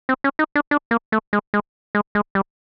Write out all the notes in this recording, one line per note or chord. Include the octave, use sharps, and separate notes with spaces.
C4
C#4
D#4
D4
D4
A#3
A3
G#3
G#3
G#3
G#3
G3